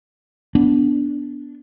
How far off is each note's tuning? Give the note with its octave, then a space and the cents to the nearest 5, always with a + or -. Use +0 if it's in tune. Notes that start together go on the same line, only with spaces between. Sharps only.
B3 +0 D4 -15